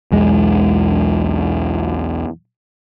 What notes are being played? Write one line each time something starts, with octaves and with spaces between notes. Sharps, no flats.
B1 E2 G#3